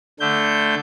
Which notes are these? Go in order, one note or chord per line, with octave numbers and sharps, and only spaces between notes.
D3 A3 G6